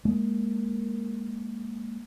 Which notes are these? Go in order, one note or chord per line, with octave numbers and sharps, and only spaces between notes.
G#3 A#3